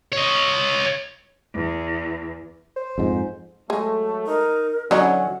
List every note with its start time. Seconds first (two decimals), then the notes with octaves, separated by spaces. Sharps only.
0.13 C#5 D#5
1.54 E2
2.76 C5
2.98 F2 G#2
3.70 F#3 G#3 A3
4.27 D#4 A#4
4.91 D3 F#3 C#4 D#4 E4 F#5